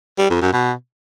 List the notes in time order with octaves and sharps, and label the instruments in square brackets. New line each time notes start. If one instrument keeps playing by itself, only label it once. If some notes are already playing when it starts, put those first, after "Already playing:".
[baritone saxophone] G3
F2
F#2
B2